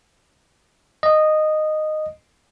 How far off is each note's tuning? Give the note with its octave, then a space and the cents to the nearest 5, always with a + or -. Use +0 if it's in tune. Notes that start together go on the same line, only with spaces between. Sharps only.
D#5 -10